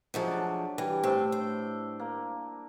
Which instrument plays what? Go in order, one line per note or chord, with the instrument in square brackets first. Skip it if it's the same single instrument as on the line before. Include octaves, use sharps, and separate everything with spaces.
[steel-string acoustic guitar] F3 G#3 A3 [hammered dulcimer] F#3
[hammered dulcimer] D4
[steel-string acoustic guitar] E3 [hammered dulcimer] G3
[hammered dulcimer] A2 D4 E5 [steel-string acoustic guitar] C4
[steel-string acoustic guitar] C5
[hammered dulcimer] A#3